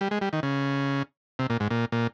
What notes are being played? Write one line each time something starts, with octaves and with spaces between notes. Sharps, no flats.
G3
G#3
G3
D#3
C#3
C3
A#2
G#2
A#2
A#2